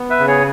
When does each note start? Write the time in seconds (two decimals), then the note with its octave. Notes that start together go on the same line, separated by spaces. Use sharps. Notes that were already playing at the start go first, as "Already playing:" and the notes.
Already playing: B3
0.10 B4 E5
0.19 C#3
0.27 G#4 C#5